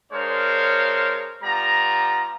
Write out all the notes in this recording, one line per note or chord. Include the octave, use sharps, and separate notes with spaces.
G#3 D4 A#4 C5 C#5 F5
G3 B3 F4 A#5